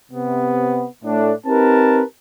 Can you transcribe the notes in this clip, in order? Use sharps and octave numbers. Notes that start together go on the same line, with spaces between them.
C3 B3
A2 D4
C4 D#4 G4 A#4 B4 A5